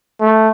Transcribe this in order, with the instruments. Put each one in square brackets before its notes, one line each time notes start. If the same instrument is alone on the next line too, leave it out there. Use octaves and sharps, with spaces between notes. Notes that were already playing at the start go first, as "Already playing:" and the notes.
[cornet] A3